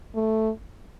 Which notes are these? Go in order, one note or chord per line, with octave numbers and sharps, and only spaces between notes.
A3